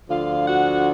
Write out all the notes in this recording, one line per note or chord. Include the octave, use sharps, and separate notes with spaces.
D2 D3 F3 F4 F5
F#4 F#5